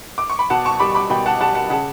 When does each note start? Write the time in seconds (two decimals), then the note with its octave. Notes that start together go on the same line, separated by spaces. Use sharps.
0.18 D6
0.30 C#6
0.39 B5
0.50 B2 F#5 A5
0.65 A5 C#6
0.80 G3 B5 D6
0.95 B5 D6
1.10 B2 G5 B5
1.26 F#5 A5
1.40 G3 F#5 A5
1.55 F#5 A5
1.70 C#3 F#5 A5